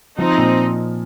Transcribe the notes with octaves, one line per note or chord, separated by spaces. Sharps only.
F3 C4 D#4
A#2